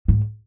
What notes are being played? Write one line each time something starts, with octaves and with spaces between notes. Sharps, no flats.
G#2